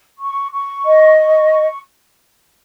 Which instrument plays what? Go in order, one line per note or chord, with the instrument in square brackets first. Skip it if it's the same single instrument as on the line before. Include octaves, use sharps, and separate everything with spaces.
[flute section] C#6
C#6
D#5
C#6
C#6